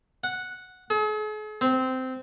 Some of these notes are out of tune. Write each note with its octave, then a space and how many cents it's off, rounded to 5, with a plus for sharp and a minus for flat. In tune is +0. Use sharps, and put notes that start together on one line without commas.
F#5 -5
G#4 +45
C4 -15